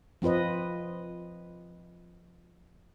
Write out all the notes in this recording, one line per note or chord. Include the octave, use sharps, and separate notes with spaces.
F3 C4 F4 B4 D#5